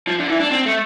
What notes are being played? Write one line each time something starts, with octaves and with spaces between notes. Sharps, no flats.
F3
D3
E3
D4
C4
A3